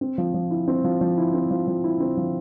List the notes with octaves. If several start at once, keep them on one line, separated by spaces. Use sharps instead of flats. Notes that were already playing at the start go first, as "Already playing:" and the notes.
C4
F3
F3
E4
C4
F3
F3
E4
C4
F3
F3
E4
C4
F3